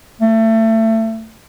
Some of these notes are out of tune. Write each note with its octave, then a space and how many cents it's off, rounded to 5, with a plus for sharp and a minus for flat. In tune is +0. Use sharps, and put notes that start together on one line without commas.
A3 +25